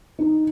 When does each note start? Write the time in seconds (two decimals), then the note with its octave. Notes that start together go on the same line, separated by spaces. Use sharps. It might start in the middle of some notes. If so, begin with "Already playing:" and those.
0.19 D#4